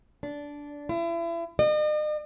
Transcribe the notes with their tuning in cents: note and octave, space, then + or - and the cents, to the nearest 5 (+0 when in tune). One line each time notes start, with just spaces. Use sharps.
D4 -15
E4 +35
D#5 -45